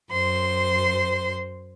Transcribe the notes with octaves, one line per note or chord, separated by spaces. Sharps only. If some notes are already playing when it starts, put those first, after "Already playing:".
F#2 C5 C6